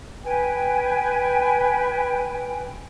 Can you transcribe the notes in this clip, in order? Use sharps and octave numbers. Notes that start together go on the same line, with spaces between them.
B4 G5 G#5